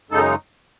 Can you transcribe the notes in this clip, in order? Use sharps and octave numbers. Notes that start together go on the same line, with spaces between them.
F#2 C#3 G#3 D#4 A4